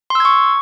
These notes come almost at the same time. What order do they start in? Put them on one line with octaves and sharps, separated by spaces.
C6 E6 G#6 C#6